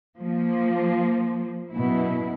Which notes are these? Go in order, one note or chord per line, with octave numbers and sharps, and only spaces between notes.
F3 A#3
F#2 B2 E4